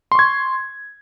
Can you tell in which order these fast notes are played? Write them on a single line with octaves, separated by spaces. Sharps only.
C6 C#6 G#6